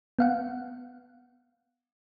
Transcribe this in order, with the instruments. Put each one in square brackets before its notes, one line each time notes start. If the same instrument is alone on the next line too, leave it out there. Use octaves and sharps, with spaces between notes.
[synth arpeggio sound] B3 F5 F#5